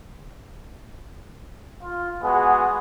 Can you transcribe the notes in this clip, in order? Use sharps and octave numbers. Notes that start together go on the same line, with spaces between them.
F4
G#3 B3 F#4 G#4